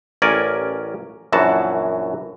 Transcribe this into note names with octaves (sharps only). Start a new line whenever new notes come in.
A1 C#4 A#4 D5 G#5
A#1 F#2 E3 F#4 A5